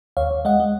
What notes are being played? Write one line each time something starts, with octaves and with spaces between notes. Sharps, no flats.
D#2 C#5 F5
D#2
G#3 D#5 F#5
G#3